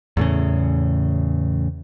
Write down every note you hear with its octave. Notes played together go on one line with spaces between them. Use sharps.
E2 A2 C#3